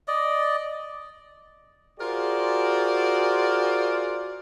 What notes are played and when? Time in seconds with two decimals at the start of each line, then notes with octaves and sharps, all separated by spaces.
0.08 D5 D#5
2.00 F4 F#4 G#4 A#4 C5 D5